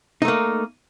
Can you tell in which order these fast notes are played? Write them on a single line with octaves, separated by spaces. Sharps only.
D#4 A3 A#3